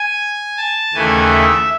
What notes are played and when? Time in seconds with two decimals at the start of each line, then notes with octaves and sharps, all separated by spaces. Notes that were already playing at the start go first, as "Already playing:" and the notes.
Already playing: G#5
0.57 A5
0.94 D#2 C#3 E3 A3 G#5
1.31 E5